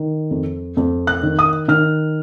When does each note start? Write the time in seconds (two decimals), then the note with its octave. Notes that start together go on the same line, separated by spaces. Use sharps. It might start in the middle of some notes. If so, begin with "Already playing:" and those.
Already playing: D#3
0.31 F2
0.77 F2
1.07 F#6
1.23 D#3
1.39 D#6
1.68 D#3 F6